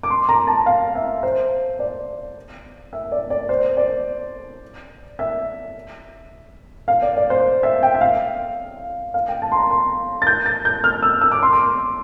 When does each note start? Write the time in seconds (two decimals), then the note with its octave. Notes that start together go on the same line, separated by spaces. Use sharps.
0.03 D6
0.10 C6
0.29 A#5
0.47 A5
0.66 F5
0.95 E5
1.23 C5
1.79 D5
2.93 E5
3.12 D5
3.30 D5
3.49 C5
3.77 D5
5.19 E5
6.88 F5
7.02 D5
7.17 D5
7.30 C5
7.63 E5
7.83 G5
7.95 E5
8.01 F5
9.14 F5
9.28 G5
9.42 A5
9.52 C6
9.56 A#5
9.71 C6
10.22 A6
10.27 G6
10.46 A6
10.65 G6
10.84 F6
11.03 E6
11.21 E6
11.32 D6
11.43 C6
11.53 D6